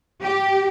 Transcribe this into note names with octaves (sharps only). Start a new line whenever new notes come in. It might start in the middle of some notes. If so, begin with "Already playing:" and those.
G4